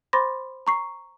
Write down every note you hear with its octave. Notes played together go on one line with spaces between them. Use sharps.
C5 B5 C6 D6 A6 A#6
A#5 C#6 C7